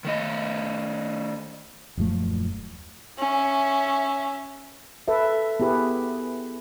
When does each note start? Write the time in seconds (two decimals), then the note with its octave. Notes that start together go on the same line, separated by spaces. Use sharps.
0.05 D#3 A3 D#5
1.97 D#1 F#2 F3 A3
3.19 C#4 E5
5.08 A4 B4 E5
5.60 B3 E4 G4 G#4 B4